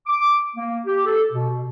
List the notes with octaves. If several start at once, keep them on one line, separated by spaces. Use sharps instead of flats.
D6
A#3
G4
A4
B2